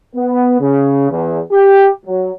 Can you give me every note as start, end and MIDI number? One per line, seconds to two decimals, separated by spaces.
0.16 0.57 59
0.60 1.08 49
1.10 1.39 40
1.51 1.89 67
2.06 2.31 54